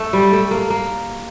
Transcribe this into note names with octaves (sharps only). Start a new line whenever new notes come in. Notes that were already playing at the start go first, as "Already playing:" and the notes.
Already playing: A3
G3
A3
A#3
A#3